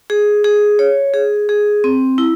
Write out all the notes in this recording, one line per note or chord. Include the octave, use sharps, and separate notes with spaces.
G#4
G#4
C#5
G#4
G#4
C4
E4